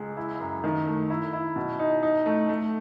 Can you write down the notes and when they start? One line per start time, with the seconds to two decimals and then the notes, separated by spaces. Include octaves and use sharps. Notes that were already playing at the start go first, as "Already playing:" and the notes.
Already playing: C#2 G#3
0.17 E4
0.40 F#2
0.64 D#3
0.87 A3
1.10 E4
1.33 E4
1.56 B2
1.79 D#4
2.03 D#4
2.26 A3
2.49 A3